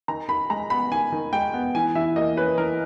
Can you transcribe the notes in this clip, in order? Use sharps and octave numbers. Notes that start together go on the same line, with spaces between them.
D#3 A#5
D#3 B5
G#3 A#5
B3 B5
D#3 G#5
D#3
G#3 G5
B3
E3 G#5
E3 E5
A#3 D#5
C#4 B4
E3 A#4